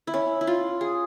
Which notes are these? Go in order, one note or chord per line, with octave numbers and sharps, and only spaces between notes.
E4
C#4
E4
F4
G#4